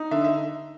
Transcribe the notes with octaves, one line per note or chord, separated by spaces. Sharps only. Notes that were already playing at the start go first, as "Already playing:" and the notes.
Already playing: D#4
D3 E5
E5